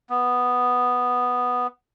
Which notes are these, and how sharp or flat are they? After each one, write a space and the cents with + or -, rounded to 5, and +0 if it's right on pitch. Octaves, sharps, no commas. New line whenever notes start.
B3 +0